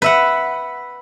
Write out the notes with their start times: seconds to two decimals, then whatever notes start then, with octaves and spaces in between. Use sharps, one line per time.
0.02 B4 E5 F#5